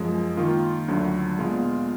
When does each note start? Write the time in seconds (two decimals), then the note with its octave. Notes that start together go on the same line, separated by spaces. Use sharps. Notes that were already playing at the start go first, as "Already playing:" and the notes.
Already playing: F#2 F3 G#3
0.37 D#3 A#3 F4
0.88 D2 D3 F#3
1.38 A#2 G#3 B3 F4